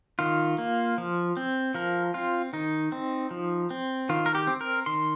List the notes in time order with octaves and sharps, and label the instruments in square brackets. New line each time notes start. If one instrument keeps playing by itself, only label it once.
[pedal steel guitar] D#3 F4
A#3
F3
C4
F3 A#4
C4 F4
D#3 D#4
C4
F3
C4
D#3 F4
A#4
G4
C4
A#4
D#3 C6